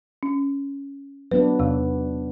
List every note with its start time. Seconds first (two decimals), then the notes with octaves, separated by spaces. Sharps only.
0.23 C#4
1.31 F#3 B3 D4 B4
1.59 E2 C3 E6